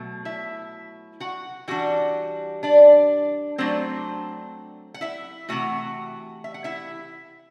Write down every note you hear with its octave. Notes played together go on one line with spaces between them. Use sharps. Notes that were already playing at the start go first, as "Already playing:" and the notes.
Already playing: B2 F#3 A3
E4 E5
F#4 F#5
E3 G3 D4 F#4 F#5
D4 D5
F#3 A3 C4 D4 C5
F#5
E4 E5
C3 E3 A3 F#4 F#5
E5
F#5
E4 E5